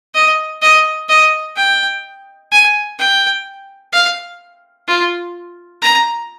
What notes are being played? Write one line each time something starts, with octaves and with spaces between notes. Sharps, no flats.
D#5
D#5
D#5
G5
G#5
G5
F5
F4
A#5